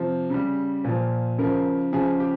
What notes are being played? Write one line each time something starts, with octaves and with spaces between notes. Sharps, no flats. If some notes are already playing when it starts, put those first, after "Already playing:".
Already playing: C3 F3
C#3 G3
A#2 F3
C#3 F3 A#4
C#3 F3 G#4
G4